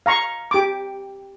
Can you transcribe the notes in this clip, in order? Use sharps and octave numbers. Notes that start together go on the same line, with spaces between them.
F5 A#5 C#6
G4 D6